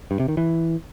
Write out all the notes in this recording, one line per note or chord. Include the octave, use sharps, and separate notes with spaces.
G2
C3
D#3
E3